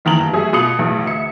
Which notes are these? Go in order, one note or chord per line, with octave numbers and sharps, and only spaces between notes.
F#1 D#3 E3 A#5 F#7
G1
F#3 A3 G#4 A4 E5
B2 F4 D#6 C#7 F#7
B1 E2 A2
D2 E5 C#7